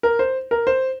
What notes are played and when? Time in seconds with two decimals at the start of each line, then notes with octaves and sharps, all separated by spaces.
0.03 A#4
0.19 C5
0.51 A#4
0.67 C5